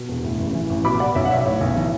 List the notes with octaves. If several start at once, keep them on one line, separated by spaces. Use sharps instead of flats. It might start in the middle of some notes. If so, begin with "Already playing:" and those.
Already playing: B2
E1
A2
A1
E3
A1
B2 B5 D6
B2 D5 F#5
B1 C#5 E5
F#5
B1 C#5 E5
A2 C#5
B1
E3